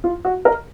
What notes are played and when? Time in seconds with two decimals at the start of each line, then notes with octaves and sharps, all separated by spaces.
0.04 F4
0.25 F#4
0.45 A#4